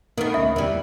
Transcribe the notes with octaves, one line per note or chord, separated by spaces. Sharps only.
D#3 A#3 B3 A4
D2 A#3 C#4 E5
E2 E3 G3